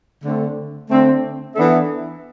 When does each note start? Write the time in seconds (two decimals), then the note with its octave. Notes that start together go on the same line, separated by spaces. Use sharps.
0.23 D3 A3 C4
0.89 D3 A3 C4
1.56 E3 B3 D4 A4 E5